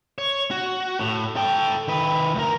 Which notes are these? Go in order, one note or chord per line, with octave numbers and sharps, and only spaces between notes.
C#5
F#4
A2
A4 G5
D#3 B4
D2 A#4